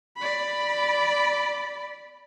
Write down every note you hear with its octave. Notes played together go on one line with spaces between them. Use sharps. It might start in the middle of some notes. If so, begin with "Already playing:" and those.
D5 B5